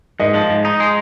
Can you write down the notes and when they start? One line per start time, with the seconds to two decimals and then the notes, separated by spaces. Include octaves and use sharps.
0.20 G#2 D#5
0.35 F3
0.50 G#2
0.65 D#4
0.80 G#3